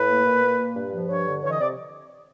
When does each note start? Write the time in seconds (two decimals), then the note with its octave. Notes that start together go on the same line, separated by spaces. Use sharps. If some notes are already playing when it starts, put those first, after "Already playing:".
Already playing: A2 B4
0.08 A#3
0.25 A#2
0.43 A#3
0.58 A#2
0.75 G2
0.92 F3
1.09 G2 C#5
1.26 D3
1.42 E3 C#5
1.51 D#5
1.59 C3 D5